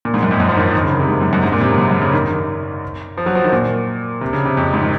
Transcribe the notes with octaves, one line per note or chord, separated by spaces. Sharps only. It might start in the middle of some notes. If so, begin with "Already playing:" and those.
A#2
G#2
F#2
F2
F#2
F3
D#3
F3
D#3
C#3
D#3
C3
G#2
F#2
F#2
G#2
A#2
C3
C#3
F#2
F#2
C#3
D#3
D#3
F3
F#3
F3
D#3
A#2
C3
C#3
C3
F2
G#2
D#3